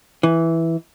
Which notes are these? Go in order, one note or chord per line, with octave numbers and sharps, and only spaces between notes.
E3